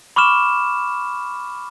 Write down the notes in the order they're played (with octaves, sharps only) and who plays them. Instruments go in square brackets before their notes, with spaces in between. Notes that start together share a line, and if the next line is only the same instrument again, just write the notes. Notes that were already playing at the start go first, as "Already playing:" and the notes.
[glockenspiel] B5 C#6 D6 F6 E7